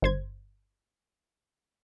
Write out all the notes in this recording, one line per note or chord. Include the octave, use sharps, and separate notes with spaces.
G1 C5 G#6